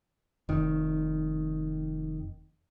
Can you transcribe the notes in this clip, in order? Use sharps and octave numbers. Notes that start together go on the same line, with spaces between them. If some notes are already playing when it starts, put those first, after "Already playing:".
F1 D#3